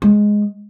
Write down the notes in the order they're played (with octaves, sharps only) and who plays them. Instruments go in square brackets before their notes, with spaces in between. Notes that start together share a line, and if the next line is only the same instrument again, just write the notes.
[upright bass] G#3